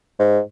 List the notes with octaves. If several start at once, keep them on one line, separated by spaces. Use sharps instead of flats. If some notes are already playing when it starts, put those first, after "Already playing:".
G#2